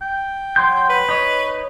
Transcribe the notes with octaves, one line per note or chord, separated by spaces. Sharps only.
G5
F#3 C6 G6
B4
D#4 C#5